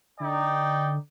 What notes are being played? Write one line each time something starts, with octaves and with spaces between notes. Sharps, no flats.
D3 D#4 D5 G5